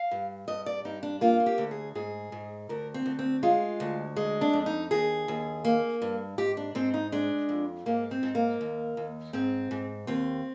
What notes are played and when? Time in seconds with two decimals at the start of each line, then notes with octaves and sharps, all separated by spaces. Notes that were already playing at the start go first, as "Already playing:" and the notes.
Already playing: F5
0.11 G2
0.48 G2 D#5
0.66 D5
0.85 G2 D#4
1.03 D4
1.21 A#3 F4
1.40 F4
1.46 G4
1.58 D2
1.71 G#4
1.95 G#2 G#4
2.32 G#2
2.69 D2 A#4
2.94 C4
3.06 D2
3.19 C4
3.43 G#3 F4
3.80 D2
4.17 G#3
4.41 D4
4.53 F2
4.66 D#4
4.91 D#2 G#4
5.28 D#2
5.65 A#3
6.02 G2
6.38 G#2 G4
6.57 D4
6.75 G#2 C4
6.94 D#4
7.12 G#3 D4
7.49 F2
7.86 G#2 A#3
8.11 C4
8.23 G#2
8.35 A#3
8.61 D#2
8.97 D#2
9.33 G#2 C4
9.71 G#2
10.07 D#2 C4